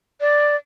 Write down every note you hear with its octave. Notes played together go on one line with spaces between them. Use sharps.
D5